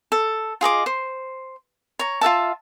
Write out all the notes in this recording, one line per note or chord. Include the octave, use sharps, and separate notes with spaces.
A4
F4 G#4 D#5 D6
C5
C#5 A#5
F4 A4 E5 A5